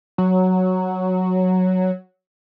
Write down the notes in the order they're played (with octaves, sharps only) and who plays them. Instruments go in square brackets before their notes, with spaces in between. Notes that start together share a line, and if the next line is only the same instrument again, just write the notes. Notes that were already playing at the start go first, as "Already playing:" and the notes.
[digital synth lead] F#3